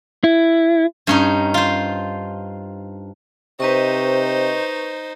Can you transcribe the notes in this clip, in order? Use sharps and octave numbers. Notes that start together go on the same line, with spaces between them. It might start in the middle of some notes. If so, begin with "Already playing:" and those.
E4
G2 C#4 D#4
F4 C5
C3 D#4 B4 C5 D#5 C#6